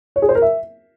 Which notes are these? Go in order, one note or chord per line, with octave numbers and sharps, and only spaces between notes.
C#5
G#4
C5
A#4
E5